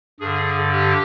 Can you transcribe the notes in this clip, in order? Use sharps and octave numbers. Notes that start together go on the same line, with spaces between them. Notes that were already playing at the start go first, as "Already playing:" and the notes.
G2 D3 G#4
G4